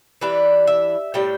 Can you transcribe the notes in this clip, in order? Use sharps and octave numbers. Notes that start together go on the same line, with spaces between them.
E3 G3 D4 B4
E5
A2 G3 D4 G5